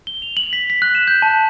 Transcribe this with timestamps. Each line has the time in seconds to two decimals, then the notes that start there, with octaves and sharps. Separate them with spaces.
0.07 G7
0.22 F7
0.37 F#7
0.53 B6
0.70 B6
0.82 F#6
0.95 E7
1.08 G6
1.22 A5